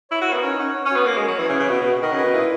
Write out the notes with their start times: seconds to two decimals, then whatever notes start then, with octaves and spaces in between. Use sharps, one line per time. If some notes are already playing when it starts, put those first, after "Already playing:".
0.11 E4 C#5
0.21 F#4
0.28 A#4
0.33 B3
0.43 C#4 D#4
0.59 C#4 F#5
0.75 C#5
0.85 C#4
0.91 F#4
0.96 B3
1.06 A#3 C#4
1.17 G#3
1.22 G#5
1.27 F#3
1.38 E3 E5
1.49 C#3
1.54 B4
1.59 C#3
1.69 B2 F#4
1.81 B2
1.86 F#4
2.02 D#3 D#5
2.12 C#3
2.18 B4
2.24 B2
2.33 A#2 E4